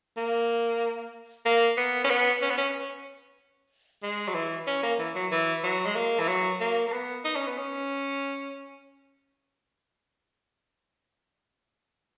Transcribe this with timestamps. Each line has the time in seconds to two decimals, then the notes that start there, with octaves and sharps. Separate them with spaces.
0.17 A#3
1.45 A#3
1.77 B3
2.04 C#4
2.09 B3
2.42 C#4
2.50 B3
2.57 C#4
4.03 G#3
4.28 F#3
4.34 E3
4.67 C#4
4.83 A#3
4.99 E3
5.15 F#3
5.31 E3
5.63 F#3
5.86 G#3
5.95 A#3
6.19 E3
6.28 F#3
6.60 A#3
6.87 A#3
6.92 B3
7.24 D#4
7.35 C#4
7.46 B3
7.58 C#4